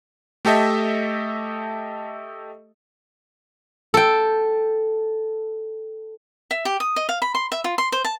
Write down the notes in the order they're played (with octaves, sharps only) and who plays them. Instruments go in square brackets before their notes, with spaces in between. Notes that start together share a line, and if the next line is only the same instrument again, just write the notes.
[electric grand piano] A3 G4 A4 D#5 E5
[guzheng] A4 G5
[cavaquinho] E5
G4
D#6
D#5
F5
B5
C6
E5
F4
C6
C5
A5